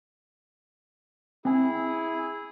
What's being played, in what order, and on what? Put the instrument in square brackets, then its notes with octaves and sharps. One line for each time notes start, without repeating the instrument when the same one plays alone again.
[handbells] C4 G#5 [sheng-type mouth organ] E4 G#4